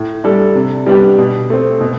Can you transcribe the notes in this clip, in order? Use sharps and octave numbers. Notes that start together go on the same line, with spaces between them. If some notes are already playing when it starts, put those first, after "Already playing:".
Already playing: A2
G3 D4 A4
C3
G3 B3 D4 G4
B2
A3 C4
B2